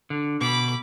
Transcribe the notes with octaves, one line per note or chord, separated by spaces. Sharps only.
D3
B2 B5 D6